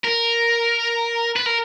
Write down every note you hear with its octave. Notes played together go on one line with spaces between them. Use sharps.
A#4
B4
A#4